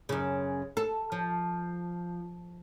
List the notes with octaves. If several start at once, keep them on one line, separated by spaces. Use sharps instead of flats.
F#2 C#3
A4
F3